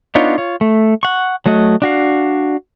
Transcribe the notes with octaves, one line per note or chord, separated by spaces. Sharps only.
B3 D4 D#4 F4 C#5
F4 C#5
A3
F#5 C#6
F#3 A3 F#4 D#5
D4 F#4 F5